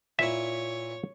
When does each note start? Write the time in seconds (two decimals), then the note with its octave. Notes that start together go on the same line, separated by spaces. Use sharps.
0.19 A#2 E4 C#5 E5